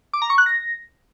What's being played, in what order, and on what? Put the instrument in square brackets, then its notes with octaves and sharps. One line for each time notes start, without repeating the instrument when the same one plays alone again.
[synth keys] D6
A#5
C#6
F#6
A#6